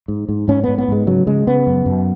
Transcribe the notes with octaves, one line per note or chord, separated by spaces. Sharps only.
G#2
G#2
G#2 C#4
G#2 B3
B3
G#2 G#3
C#3 F#3
C#3 G#3
C#3 B3
F#2
F#2